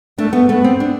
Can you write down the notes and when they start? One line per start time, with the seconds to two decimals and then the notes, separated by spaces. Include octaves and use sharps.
0.18 A3 D4
0.33 B3
0.49 A3 B3
0.64 C4
0.80 D4